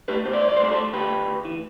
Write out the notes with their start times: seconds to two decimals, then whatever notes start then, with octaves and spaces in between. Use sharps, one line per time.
0.08 A3 G4 B4
0.26 B2 C5
0.33 D5
0.41 C2 C5
0.49 D5
0.56 C5
0.59 A3 D5
0.71 A4 C5
0.77 A3
0.93 D2 G4 B4
1.11 D2
1.27 D2
1.45 E3